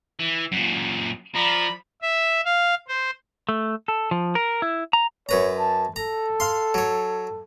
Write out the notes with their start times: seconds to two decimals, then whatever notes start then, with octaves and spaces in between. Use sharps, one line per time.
0.20 E3
0.52 F#2 A#2
1.35 F3 D5 A#5 B5
2.02 E5
2.46 F5
2.88 C5
3.49 A3
3.88 A4
4.11 F3
4.35 A#4
4.62 E4
4.93 A#5
5.29 F#2 B4 C#5 A#5
5.59 A5
5.96 A4 A#5
6.40 F5 C6
6.74 F#3 C#5